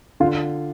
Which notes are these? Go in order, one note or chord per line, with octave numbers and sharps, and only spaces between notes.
D3 F4